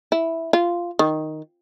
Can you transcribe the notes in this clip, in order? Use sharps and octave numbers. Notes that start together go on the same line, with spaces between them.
E4
F4
D#3